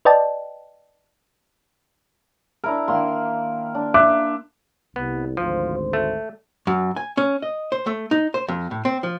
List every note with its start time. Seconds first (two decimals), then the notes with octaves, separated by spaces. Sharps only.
0.05 B4 D5 D#5 G5 A5
2.64 D4 E4 A#4
2.88 D#3 A#3 C6
3.75 D4
3.94 E5 C6 D6 F#6
4.96 C2 B3
5.37 G#1 D2 F3 C5
5.93 A3
6.67 F#2
6.96 G#5
7.17 C#4
7.42 D#5
7.72 C5
7.87 A3
8.11 D#4
8.34 C5
8.49 F2
8.71 A2
8.85 C4
9.03 F3